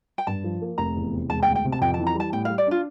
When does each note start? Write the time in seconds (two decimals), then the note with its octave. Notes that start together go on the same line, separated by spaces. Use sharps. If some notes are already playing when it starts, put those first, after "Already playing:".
0.18 G5
0.27 G2 A5
0.44 F3
0.62 A#3
0.78 F1 A#5
0.96 E2
1.12 C3
1.29 E1 A5
1.43 D2 G5
1.55 G5
1.64 C3
1.72 A5
1.81 F2 G5
1.94 A5
1.98 E3
2.07 A#5
2.15 G3 A5
2.32 A2 G5
2.45 F5
2.50 G3
2.58 D5
2.67 D4 F4